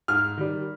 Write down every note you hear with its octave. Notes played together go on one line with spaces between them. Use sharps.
G#2 F6
D#3 G3